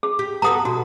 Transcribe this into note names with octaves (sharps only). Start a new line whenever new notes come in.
G#4
G4
B3 F#4 A4 A#5 D#6
B2 F#4